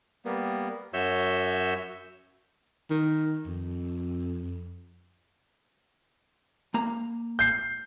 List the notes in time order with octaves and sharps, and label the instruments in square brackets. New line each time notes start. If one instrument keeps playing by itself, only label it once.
[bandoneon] G3 A#3 B3
F#2 F#4 C#5 E5 E6 G6
[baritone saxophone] D#3
F2
[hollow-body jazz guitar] A#3 A#5
[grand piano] G6 C7